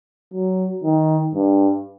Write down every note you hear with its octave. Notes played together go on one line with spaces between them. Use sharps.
F#3
D#3
G2